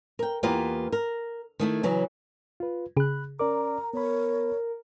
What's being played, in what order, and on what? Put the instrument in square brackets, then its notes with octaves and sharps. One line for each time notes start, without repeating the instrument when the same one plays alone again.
[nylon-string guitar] A#4 G5
E2 A#3 B3 F4 G4
A#4
D#3 A3 E4
C#3 E3 F#3
[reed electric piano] F4 B4
[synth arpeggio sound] C#3 G#4 [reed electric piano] B5 F#6
[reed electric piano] C#4 D5 D6 [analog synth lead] A#4 [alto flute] A#5
[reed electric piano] B3 B5 [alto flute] C#5